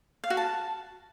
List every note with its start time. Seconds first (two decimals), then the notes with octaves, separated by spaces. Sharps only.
0.24 F5
0.30 F#4
0.37 A5